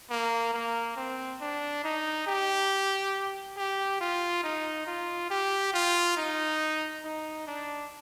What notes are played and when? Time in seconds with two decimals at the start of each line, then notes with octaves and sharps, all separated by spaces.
0.10 A#3
0.54 A#3
0.97 C4
1.41 D4
1.84 D#4
2.27 G4
3.57 G4
4.00 F4
4.44 D#4
4.86 F4
5.30 G4
5.74 F4
6.17 D#4
7.04 D#4
7.47 D4